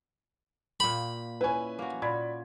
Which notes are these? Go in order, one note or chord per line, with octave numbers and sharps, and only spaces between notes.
A#2 A#3 G5 B5
C#4 E4 B4 G#5
A#3 F#4
A#2 D5 B5 G#6